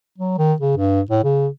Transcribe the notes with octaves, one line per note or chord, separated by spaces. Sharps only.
F#3
D#3
C#3
G2
A2
C#3